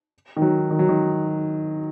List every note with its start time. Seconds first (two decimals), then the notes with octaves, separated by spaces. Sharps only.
0.36 D#3
0.42 F#3
0.71 D#3
0.79 F#3
0.89 D#3